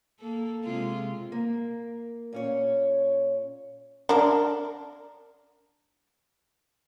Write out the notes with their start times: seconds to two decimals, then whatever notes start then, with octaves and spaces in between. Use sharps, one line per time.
0.20 A#3 A4
0.64 C3 G#3 F4
1.32 A#3
2.33 A#2 C#4 C#5
4.09 D4 A#4